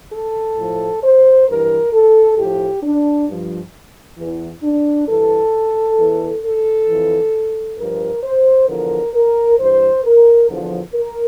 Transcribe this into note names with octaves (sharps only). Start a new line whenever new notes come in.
A4
A2 F3
C5
G2 E3 A#4
A4
A2 F3 G4
D4
G2 F3
E2 E3
D4
G2 E3 A4
E2 E3
A4
F2 E3
G2 F3 A#4
C5
E2 D3 F3 A#4
A#4
G2 E3 C5
A#4
E2 D3 F3
A#4